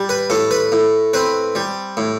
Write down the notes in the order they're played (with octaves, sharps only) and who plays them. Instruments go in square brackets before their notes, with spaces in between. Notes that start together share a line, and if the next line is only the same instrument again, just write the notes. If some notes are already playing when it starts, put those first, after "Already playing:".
Already playing: [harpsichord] G3
B4
A2 A4
B4
A2
C4 B4
G3
A2